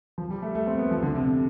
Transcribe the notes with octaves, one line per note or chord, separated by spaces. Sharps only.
F3
G3
A3
A3
C4
B3
F3
D3
C3